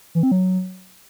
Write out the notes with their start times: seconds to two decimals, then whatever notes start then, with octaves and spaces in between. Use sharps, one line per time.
0.15 E3
0.23 C4
0.31 F#3